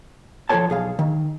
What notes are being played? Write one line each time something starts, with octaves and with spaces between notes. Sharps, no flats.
F3 F4 A4 C5 C#5 A5
B1 G#4 F5
D#3